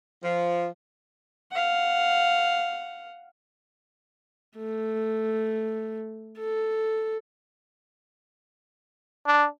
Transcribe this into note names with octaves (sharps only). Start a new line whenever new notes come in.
F3
F5 F#5
A3
A4
D4